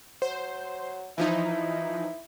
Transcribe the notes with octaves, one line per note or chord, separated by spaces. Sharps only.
F#3 C5
E3 F3 D#4 E4